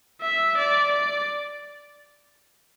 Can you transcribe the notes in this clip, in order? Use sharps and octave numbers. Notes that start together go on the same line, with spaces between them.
E5
D5
D5